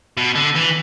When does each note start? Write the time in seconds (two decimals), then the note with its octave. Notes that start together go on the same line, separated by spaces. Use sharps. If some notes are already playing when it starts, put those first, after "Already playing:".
0.18 B2
0.36 D3
0.56 E3